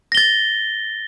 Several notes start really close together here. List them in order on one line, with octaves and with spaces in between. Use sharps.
A#6 G7 A6